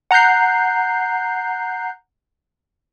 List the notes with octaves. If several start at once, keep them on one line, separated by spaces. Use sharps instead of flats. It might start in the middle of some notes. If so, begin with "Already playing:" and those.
F#5 A#5 F#6 G6 C7